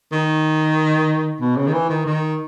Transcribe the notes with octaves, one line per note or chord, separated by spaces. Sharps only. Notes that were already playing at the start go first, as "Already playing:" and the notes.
D#3
B2
C#3
D#3
E3
D#3
D#3